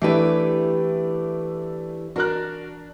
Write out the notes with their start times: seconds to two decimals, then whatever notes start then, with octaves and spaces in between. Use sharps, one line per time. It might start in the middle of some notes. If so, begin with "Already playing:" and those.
0.02 E3 A3 D4 E4 G4 B4
2.16 D4 F#4 A#4 F#6